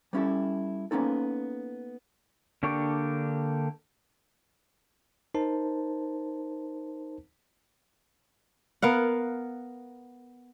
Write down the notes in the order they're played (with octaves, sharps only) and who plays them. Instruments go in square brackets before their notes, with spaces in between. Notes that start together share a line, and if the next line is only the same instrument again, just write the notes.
[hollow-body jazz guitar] G3 B3 C#4 E4 G4 A4
A#3 B3 C#4 D#4 A4
[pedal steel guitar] D3 A#3 D4 G4 C#6
[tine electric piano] D#4 A#4 C5 A5
[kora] B3 A#4 F5 F#5